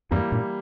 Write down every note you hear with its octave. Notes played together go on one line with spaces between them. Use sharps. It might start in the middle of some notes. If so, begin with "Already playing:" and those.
E2 G2 E3 G3 A#3 E4
G2 A#2